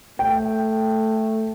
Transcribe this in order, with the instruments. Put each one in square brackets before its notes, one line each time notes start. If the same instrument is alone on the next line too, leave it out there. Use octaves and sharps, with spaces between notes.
[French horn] A3 [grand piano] G5